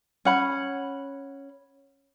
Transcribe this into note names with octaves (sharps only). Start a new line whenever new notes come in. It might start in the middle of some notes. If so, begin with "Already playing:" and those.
C#4 F#5 B5